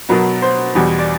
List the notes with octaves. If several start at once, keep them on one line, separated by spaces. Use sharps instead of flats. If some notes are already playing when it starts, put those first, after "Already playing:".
B2 F#3 B3 A#4
C5
E2 B2 G3
D5